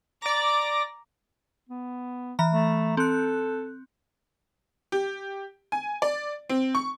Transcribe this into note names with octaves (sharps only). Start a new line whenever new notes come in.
D5 A#5 D6 A#6
B3
E3 A#5
A3
C4 A4 F#6
G4
G#5
D5
C4
C#6